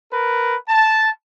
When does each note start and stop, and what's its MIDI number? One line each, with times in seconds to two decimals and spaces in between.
0.12 0.56 70
0.12 0.56 71
0.68 1.08 81